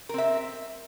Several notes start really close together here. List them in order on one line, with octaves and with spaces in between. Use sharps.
A#4 C4 E5